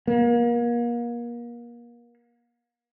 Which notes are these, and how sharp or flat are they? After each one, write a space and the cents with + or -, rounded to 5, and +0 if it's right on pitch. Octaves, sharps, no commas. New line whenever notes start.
A#3 +35